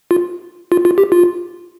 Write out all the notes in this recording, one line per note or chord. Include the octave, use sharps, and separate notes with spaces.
F4
F4
F4
G4
F4